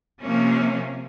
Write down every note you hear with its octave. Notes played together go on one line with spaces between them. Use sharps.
C3 F3 A#3 C#4